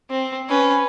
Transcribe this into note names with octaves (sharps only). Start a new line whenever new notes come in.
C4
C#4 B4